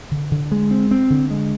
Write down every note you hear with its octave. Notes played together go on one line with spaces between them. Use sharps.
D3
D3
G#3
C4
C4
D3
G#3